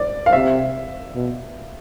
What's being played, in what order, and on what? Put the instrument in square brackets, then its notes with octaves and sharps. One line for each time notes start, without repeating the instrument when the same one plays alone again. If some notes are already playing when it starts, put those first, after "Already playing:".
Already playing: [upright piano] D5
F5
[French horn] C3 [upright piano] E5
[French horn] B2